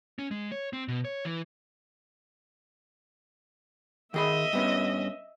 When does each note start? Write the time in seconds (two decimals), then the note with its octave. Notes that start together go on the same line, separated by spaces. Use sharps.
0.19 C#4
0.31 G#3
0.52 C#5
0.73 C4
0.88 B2
1.05 C#5
1.25 E3
4.14 D#3 G#4 D#5 E5 B5
4.53 G2 B3 C#4